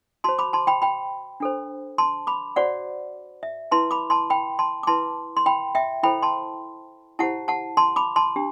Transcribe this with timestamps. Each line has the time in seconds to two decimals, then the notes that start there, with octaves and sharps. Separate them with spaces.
0.24 F#4 C5 A5 C6
0.39 B5 D6
0.53 A5 C6
0.67 G5 B5
0.82 G5 B5
1.40 D4 A4 C5
1.98 A5 C6
2.27 B5 D6
2.56 F#4 C5 D5 F#5
3.43 E5
3.71 E4 B4 A5 C6
3.91 B5 D6
4.10 A5 C6
4.30 G5 B5
4.59 A5 C6
4.83 D6
4.87 E4 B4 A5 C6
5.37 C6
5.46 G5 B5
5.75 E5 G5
6.03 E4 A4 C5 G5 B5
6.22 A5 C6
7.19 E4 G4 C5 F#5 A5
7.48 F#5 A5
7.77 A5 C6
7.96 B5 D6
8.16 A5 C6
8.36 D4 G4